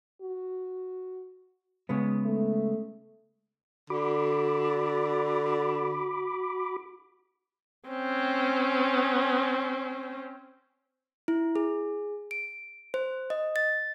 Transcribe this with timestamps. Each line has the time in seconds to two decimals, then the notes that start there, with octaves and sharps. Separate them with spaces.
0.21 F#4
1.89 C#3 G#3 B3
2.25 A3
3.90 D3 F#4 B5 D6
7.89 C4 C#4
11.28 E4
11.56 G#4
12.31 D7
12.94 C5
13.30 D#5
13.56 A6